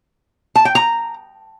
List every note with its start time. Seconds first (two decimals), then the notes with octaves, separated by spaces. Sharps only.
0.56 A5
0.65 G5
0.75 A#5